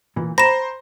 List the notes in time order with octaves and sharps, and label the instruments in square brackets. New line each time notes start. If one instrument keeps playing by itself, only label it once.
[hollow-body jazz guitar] A#2 E3
[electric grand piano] C5 [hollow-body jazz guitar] G5 A#5 B5 [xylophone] A#6 E7